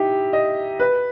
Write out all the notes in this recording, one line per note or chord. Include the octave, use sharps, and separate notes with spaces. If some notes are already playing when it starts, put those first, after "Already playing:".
Already playing: D#4 E4 G4
D#5
B4